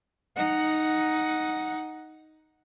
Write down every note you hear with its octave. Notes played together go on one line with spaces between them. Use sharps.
D#4 F#5